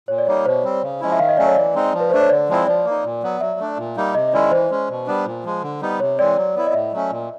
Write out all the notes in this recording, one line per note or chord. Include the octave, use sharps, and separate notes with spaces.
A#2 C#5
D5
G3 A#3 D#4 C#5
B2 C5
G3 C4
C#3
F3 G#3 C#4 E4 D#5
E5
D#3 F5
D#5
F#3 A3 C#4 D5
C#5
E3 D5
G#3 C4 D#4
F3
B4
A3 D4 C5
C#5
D3 D5
F3 G#3 C4 E4
F3 D5
A#3
D#4
A#2
F#3 B3
F#3 E5
A3 D4
A#2
G3 A#3 D#4
C3 D#5
D#5
D#3 G#3 C#4 E4 D5
E3 C5
G#3 C#4
B2
G3 B3 D4
A#2
F3 G#3
D3
G3 B3 D#4
C3 C#5
E3 G#3 C4 D5
F#3
B3 E4
D#5
A2 E5
F#3 A3 C#4
A#2